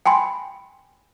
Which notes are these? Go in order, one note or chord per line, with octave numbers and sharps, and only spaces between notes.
G5 G#5 B5 C6